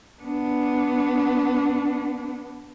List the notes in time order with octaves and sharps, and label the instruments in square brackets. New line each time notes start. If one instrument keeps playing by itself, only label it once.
[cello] B3 D4